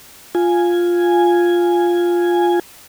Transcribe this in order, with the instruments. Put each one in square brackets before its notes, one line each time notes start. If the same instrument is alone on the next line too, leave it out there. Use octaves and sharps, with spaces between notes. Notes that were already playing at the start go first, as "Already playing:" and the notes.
[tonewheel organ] F4 G#5